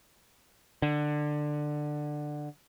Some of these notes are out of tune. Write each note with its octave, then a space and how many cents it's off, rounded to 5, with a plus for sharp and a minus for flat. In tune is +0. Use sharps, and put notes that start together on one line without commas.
D3 +15